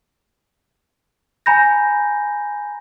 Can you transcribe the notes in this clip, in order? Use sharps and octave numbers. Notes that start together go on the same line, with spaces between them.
G#5 A#5 B5 G6 A#6